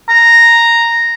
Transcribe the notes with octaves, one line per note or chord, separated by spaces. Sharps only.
A#5